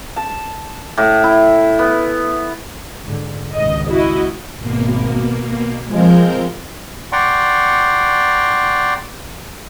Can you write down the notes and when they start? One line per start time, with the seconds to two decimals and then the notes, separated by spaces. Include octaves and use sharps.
0.16 A5
0.97 A2
1.24 E4
1.79 B3
3.04 G#2 D3
3.55 G#1 C#2 D#5
3.89 E4 F#4 D#5
4.60 G#1 B2 A#3
5.91 F3 G#3 C4 A#4 G6
7.12 D5 F#5 G5 A#5 C6 C#6